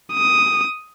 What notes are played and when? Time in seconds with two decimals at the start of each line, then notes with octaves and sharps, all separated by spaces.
0.14 D#6